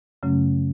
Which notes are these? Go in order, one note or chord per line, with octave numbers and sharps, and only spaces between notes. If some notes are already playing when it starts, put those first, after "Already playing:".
F#2 C#3 F#3 A3 C#4